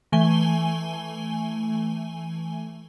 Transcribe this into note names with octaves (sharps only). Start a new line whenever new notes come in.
E3 A3 G#5 G7